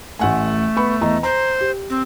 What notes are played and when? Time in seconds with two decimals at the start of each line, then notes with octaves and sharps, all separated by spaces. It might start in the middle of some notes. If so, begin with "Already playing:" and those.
0.19 A1 A3 F#5 G#5
0.76 B3 B5 C#6
1.01 E2 D#5 A#5
1.23 C5 A#5
1.61 G4
1.90 C4